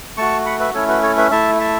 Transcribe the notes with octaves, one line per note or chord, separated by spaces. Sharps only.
A3 F#4 A5 C#6
F#5 B5
B4 E5
A3 C#4 E4 A4 C#5
F#4 B4
A4 C#5
B4 E5
A3 E4 E5 A5
E5 A5